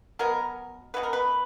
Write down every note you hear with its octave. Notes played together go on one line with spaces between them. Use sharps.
B2 F#3 B3 A#4
B2 F#3 B3 B4
A#4
B4